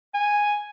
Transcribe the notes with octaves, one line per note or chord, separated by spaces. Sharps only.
G#5